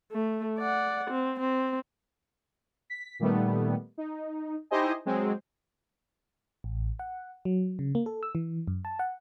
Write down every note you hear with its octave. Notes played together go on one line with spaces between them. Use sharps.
A3
D5 F#5
C4
C4
B6
A#2 D#3 G3 A3 B3
D#4
D#4 E4 G4 C5 D#5 G#5
F#3 G#3 C4
A1
F#5
F#3
C#3
A#3
A4
E6
E3
F#2
A5
F#5